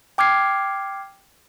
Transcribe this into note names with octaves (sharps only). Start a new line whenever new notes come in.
G5 D6 F6 G#6 C7